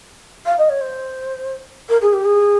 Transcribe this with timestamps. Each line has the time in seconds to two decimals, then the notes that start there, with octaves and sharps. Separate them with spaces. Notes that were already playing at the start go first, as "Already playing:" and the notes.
0.46 F5
0.58 D#5
0.69 C#5
0.81 C5
1.89 A#4
2.02 G#4
2.13 G4
2.25 G#4